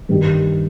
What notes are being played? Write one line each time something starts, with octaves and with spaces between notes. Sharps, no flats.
G2 D#3 G3